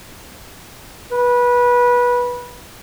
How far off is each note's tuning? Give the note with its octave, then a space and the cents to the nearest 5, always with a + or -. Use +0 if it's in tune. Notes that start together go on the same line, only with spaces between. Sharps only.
B4 -20